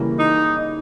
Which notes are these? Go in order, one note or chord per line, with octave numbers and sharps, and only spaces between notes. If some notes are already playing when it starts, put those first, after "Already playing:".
Already playing: C#3 E3 G3 A#3
D#4